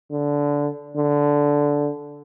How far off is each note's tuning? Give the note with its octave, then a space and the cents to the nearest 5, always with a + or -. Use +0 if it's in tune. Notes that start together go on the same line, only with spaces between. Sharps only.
D3 -15
D3 -10